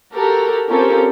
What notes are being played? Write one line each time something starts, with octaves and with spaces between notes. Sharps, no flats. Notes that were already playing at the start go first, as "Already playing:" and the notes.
F#4 G4 A4 A#4
C4 C#4 F4 G4 A4 A#4